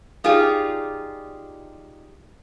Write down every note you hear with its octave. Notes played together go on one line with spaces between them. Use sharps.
D#4 F4 G4 G#4 D5